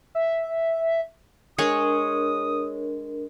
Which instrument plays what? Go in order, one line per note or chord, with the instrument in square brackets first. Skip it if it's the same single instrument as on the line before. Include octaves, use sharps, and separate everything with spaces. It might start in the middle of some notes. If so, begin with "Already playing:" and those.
[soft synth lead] E5
[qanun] G#3 G#4 C#5 [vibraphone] D4 A#4 [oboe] D#6